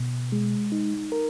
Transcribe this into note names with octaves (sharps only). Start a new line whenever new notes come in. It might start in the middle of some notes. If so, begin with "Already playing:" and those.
Already playing: B2
G#3
D#4
A#4